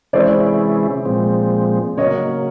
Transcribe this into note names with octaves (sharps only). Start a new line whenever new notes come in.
C3 E3 G#3 C#4 E4 C5 D5
A#2 F3 G#3 C4
C#3 F#3 A#3 C#5 D#5